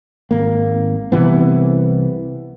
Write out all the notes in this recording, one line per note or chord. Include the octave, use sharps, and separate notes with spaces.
G#1 A#3
C2 C3 E3 B3